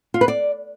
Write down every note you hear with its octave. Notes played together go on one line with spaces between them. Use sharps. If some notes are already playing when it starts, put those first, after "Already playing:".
F4
B4
D5